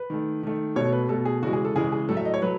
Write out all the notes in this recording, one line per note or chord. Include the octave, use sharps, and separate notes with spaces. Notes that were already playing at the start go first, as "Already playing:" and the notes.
Already playing: B4
D#3 A3
D#3 A3
B2 A3 C#5
B4
B2 A3 A4
G#4
C#3 E3 G#3 F#4
G#4
A4
C#3 E3 G#3 G#4
G#4
A2 F#3 A3 A4
E5
D#5
C#5
F#3 A3 B4